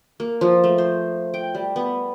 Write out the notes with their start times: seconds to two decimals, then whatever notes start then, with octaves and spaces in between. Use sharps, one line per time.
0.20 A#3
0.41 F3
0.64 A3
0.78 C5
1.34 G5
1.55 G3
1.76 B3